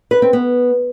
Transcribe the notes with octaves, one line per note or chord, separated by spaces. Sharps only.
B4
C4
B3